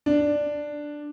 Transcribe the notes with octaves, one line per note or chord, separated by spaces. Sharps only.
D4